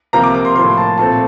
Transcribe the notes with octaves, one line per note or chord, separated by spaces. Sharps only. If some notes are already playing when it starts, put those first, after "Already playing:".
C3 F3 A#3 A#5
D6
D6
C6
A2 F3 A#3 C6
A5
A#2 A3 C4 A5